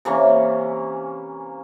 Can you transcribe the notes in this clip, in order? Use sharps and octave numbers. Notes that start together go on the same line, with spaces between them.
C3 E3 A#3 C#4